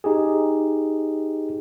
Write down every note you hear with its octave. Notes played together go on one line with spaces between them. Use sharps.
D#4 G4 G#4